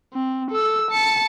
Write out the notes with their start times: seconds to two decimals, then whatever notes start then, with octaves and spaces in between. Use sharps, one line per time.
0.13 C4
0.51 A4 E6
0.91 A5 C#7